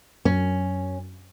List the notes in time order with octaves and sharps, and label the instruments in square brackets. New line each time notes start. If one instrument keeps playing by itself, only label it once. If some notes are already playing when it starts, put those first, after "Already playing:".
[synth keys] F#2 [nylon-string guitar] C#4